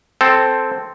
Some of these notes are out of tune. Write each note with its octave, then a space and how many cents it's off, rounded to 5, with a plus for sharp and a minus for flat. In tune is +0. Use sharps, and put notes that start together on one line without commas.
C4 +0 A4 +0